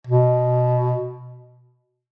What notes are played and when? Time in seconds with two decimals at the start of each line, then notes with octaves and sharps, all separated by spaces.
0.07 B2